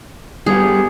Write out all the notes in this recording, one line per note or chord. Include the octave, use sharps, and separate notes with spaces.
G2 G3 B3 G#4